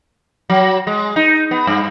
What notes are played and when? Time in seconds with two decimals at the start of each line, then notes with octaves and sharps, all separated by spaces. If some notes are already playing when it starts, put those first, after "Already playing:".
0.50 F#3
0.87 G#3
1.16 D#4
1.51 B3
1.67 G2